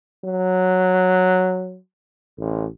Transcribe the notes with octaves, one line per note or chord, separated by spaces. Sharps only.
F#3
A1